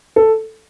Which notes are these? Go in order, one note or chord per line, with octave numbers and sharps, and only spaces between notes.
A4